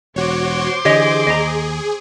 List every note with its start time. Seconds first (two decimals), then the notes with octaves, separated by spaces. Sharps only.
0.16 E1 F#4 C5 C#5 C6 D6
0.85 D3 E3 G4 G#4 C#5 D#5
1.27 D#2 D#5 A#5